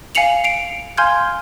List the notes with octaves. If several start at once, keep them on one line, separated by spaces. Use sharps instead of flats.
F5 G#5 C7 C#7 F7 F#7
C7 D7 F7
F5 G#5 C6 F6 G6 G#6